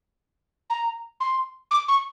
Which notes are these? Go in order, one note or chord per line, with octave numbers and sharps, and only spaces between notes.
A#5
C6
D6
C#6